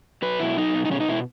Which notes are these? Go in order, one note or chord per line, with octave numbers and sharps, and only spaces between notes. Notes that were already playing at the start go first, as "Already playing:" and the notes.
F#3 B4
B2 E4
F#3 D#4
B2
D#4
B2 C#4
D#4
B2 E4